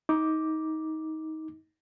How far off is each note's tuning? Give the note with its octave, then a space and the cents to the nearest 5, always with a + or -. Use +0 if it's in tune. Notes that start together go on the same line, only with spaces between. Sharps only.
D#4 +20 D6 +0